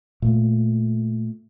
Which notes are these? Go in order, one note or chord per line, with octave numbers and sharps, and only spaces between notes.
A#2 A3